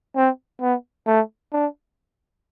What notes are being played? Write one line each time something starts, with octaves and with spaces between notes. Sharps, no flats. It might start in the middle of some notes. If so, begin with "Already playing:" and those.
C4
B3
A3
D4